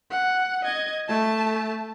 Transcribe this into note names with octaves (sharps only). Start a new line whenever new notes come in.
F#5
D#5 G#6
A3 A5